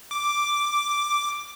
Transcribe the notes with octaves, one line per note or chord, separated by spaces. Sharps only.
D6